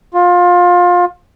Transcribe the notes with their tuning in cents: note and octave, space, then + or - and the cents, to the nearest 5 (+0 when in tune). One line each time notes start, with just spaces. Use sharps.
F4 +25